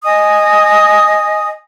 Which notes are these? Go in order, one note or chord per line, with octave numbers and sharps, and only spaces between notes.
D#5 G#5 D#6